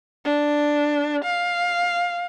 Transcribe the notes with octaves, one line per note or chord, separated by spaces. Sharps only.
D4
F5